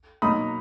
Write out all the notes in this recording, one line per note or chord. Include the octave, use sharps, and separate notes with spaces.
B2 F#3 A#3 D#4 B5 D#6